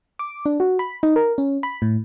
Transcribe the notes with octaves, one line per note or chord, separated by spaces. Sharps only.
D6
D4
F#4
B5
D#4
A#4
C#4
B5
A2